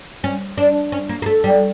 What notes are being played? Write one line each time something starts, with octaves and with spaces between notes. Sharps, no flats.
C#4
D4
C#4
A#3
A#3
A3
G3